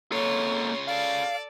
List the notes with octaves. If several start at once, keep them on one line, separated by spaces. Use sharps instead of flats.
C#3 A#3 F4 A4 C#5
A4 D5 F5